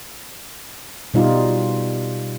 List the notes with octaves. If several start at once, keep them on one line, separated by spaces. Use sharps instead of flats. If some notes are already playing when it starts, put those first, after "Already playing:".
B2 G3 D#4 F4